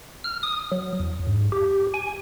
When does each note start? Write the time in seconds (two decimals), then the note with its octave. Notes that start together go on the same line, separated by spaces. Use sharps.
0.24 F6
0.43 D#6
0.72 F#3
1.00 E2
1.27 G#2
1.52 G4
1.94 G#5